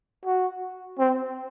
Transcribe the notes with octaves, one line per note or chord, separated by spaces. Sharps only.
F#4
C4